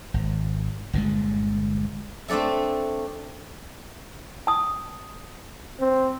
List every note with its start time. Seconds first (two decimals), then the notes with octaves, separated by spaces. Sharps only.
0.14 G#1
0.93 G1 A#2 D3 G#3
2.28 A3 C4 D4 A4 E5
4.47 A5 D#6
5.80 C4